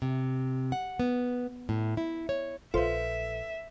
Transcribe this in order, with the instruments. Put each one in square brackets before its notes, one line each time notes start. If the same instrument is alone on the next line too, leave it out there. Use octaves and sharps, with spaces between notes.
[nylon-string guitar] C3
F#5
B3
A2
E4
C#5
[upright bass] A#1 [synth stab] F4 C5 [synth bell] A4 B4 [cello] E5